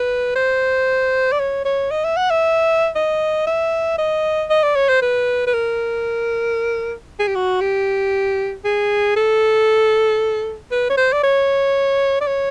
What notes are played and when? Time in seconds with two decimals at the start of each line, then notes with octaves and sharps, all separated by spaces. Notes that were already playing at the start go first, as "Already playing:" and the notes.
Already playing: B4
0.36 C5
1.32 D5
1.40 C#5
1.65 C#5
1.91 D#5
2.04 E5
2.17 F#5
2.30 E5
2.95 D#5
3.47 E5
3.98 D#5
4.50 D#5
4.63 D5
4.76 C#5
4.89 C5
5.02 B4
5.47 B4
5.53 A#4
7.19 G#4
7.27 G4
7.35 F#4
7.61 G4
8.64 G#4
9.16 A4
10.72 B4
10.89 C#5
10.97 C5
11.13 D5
11.23 C#5
12.21 D5
12.27 C#5